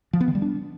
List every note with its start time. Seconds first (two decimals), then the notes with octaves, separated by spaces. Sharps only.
0.13 F3
0.21 B3
0.28 D#3
0.35 G3
0.42 D4